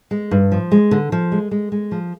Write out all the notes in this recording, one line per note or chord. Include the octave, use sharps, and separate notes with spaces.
G#3
G2
F3
G#3
D3
F3
G#3
G#3
G#3
F3